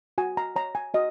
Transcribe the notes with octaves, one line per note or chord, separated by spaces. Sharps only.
F#4 G#5
A#5
C#5 A#5
G#5
F#4 D#5